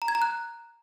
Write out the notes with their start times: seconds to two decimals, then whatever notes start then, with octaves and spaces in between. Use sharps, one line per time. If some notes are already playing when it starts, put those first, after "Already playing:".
0.02 A#5
0.08 G#6
0.15 A#5
0.22 F#6